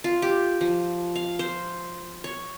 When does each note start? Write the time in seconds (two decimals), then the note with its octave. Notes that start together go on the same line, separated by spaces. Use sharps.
0.04 F4
0.22 G4
0.61 F3
1.16 F5
1.39 C5
2.24 C#5